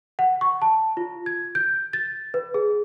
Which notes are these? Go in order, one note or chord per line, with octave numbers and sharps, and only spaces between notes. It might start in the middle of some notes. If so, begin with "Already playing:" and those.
F#5
C#6
A5
F4
G#6
G6
A6
B4
G#4